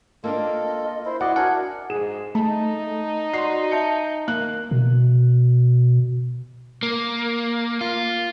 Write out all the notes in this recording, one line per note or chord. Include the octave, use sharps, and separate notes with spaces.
A#3 C4 D4 F4 A4 D#5
E4 C5
E4 F#4 D5 D#5 F#5
D4 A#4 F#5 G#5
G#2 G#4 E7
A3 D#4 A5
F#4 D5 C6 C7
E5 A5 G6 C#7
D#3 A#3 F#6
B2
A#3
F4